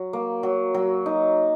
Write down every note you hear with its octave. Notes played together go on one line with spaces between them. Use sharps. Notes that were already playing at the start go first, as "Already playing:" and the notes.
Already playing: F#3
A#3
F#3
F#3
D#4